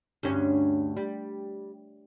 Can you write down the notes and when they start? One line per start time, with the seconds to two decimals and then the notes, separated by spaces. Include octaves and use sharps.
0.23 D2 G2 C#4
0.97 G3